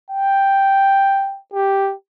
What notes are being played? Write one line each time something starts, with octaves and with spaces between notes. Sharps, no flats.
G5
G4